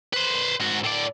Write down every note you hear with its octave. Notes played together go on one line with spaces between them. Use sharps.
B4 C5
G#2 F#4
A2 D5